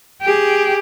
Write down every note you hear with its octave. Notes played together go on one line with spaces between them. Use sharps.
G4 G#4